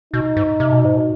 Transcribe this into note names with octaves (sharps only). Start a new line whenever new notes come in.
B2 D#4
G#2
C3
B2
G#2
B2